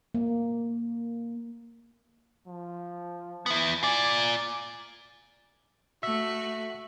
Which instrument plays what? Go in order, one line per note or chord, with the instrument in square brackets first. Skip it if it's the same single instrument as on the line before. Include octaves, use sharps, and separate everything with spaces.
[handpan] A#3
[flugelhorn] F3
[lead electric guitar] B3 E4
[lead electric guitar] F4 D5 [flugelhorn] G#5
[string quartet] A3 F#4 [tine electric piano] E5 B6